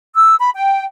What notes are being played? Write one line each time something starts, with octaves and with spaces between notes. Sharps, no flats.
E6
B5
G5